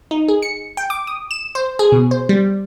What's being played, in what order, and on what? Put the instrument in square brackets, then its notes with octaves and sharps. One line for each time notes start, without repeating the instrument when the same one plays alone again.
[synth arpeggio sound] D#4
G#4
C#7
G5
D6
D#6
E7
C5
G#4
B2
C5
G3